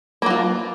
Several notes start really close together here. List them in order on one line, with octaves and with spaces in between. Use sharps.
A#3 F#3 F4